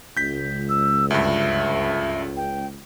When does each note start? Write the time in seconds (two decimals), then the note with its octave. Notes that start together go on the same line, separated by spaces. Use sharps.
0.17 C#2 G6 B6
0.69 E6
1.10 D2 G2 E5
2.37 G5